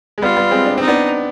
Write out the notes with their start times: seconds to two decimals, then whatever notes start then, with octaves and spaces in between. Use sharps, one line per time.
0.18 G#3
0.22 G3 B3 F4
0.37 G3 B3
0.51 G#3 C4
0.66 D4
0.78 C4 D#4
0.88 B3 D4